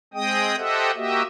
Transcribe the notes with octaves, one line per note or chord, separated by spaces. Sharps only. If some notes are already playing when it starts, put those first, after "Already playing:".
G#3 C4 G#4 D#5 G5 D#6
G4 A4 C5 D#5 E5 F#5
A#3 F#4 G4 D#5 E5